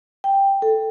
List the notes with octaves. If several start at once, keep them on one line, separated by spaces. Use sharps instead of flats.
G5
A4